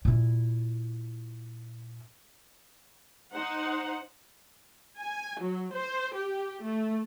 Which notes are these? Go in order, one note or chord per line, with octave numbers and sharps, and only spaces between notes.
A#2 E4
D#4 C5 F#5
G#5
F#3
C5
G4
A3